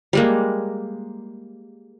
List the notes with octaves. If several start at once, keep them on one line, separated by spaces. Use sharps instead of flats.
G3 G#3 A#3